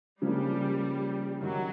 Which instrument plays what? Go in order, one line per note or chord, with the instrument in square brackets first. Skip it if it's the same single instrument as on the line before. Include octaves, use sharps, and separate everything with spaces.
[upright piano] C#3 F3 A#3 D4 [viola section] G3
[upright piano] F#2 D#3 G3 [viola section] F#3